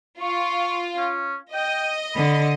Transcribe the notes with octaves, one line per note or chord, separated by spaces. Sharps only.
F4 C#6
C#4
D#5 G5
D3 B5